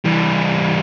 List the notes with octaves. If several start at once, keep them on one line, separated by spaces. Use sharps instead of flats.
E3 G3